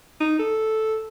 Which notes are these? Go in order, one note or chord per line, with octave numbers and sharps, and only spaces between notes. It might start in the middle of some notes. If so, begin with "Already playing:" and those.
D#4
A4